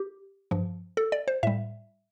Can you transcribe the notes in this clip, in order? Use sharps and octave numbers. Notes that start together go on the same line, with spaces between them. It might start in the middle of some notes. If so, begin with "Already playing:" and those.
Already playing: G4
G2 F3
A4
D5
C5
A2 G3 E5